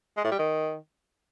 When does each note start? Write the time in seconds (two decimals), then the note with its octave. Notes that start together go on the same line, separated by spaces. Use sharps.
0.17 G#3
0.24 A2
0.32 G3
0.39 D#3